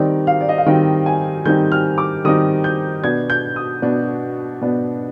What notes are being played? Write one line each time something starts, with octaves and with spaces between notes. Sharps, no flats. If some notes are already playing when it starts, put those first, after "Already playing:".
Already playing: D#3 G3 C4 D#4 D5
F5
D5
D#5
F5
D#3 G3 C4 D#4 G5
G#5
D#3 G3 C4 D#4 G6
F6
D6
D#3 G3 C4 D#4 D#6
G6
B2 B3 D4 G#6
G6
D#6
B2 B3 D4
B2 B3 D4